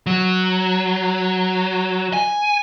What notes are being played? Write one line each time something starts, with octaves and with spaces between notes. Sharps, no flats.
F#3
G#5